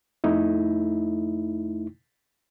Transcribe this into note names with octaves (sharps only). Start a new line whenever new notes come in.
F2 A3 D#4 E4